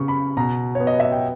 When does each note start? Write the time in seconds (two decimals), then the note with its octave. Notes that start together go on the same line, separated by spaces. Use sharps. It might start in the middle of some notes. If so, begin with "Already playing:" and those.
Already playing: C#3 B3 C#6
0.08 B5
0.37 B2 A#5
0.75 C#5
0.80 B3
0.87 D#5
1.00 E5
1.12 G5